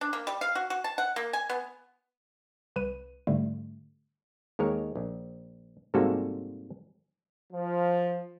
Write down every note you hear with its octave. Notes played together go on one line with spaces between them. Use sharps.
D4
A#3
G3
F5
F#4
F#4
A5
F#5
A#3
G#5
B3
C2 B4 D#7
G#2 D3 G3 A3
D#2 G#3 A#4 C#5
A#1
G#2 C3 G3 A#3 F#4 A4
F3